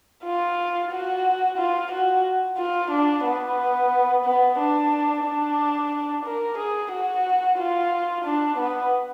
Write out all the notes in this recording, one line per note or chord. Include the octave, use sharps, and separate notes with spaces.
F4
F#4
F4
F#4
F4
D4
B3
B3
D4
D4
A#4
G#4
F#4
F4
D4
B3